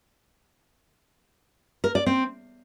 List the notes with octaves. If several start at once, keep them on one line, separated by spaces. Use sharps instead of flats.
A#4
D5
C4